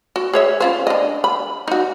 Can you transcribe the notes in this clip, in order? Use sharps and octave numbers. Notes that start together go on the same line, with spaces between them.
F#4
G#4 C#5 E5
C#4 F4 C5
D4 D#5
B5
D#4 F#4